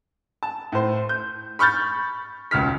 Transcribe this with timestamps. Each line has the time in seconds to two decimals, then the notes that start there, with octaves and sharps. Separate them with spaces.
0.43 A5
0.72 A2 C5
1.09 G6
1.59 B5 C#6 F6 G6 A6
2.51 E1 C#2 C#3 F6 B6